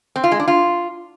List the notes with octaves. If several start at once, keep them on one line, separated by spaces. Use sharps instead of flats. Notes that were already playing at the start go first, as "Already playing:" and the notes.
C4
F4
G#3
D4
F4